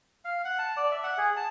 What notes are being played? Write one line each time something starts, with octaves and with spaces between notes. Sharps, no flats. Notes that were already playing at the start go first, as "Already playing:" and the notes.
F5
F#5
A5
D5
E5
F#5
G#4
A5